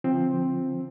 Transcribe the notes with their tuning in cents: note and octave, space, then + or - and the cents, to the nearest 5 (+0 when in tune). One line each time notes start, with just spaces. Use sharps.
D3 -25 F3 +0 C4 +10